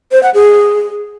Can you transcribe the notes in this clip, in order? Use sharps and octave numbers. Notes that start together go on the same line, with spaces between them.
C5
F#5
G#4